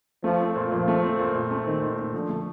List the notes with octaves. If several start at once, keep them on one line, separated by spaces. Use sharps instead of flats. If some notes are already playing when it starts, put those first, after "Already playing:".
F3 A3
C4
A#2
A#2 F3
A3
C4
A#2
A#2
A3
D#3 C4
A#2
A#2
D3 F3
A3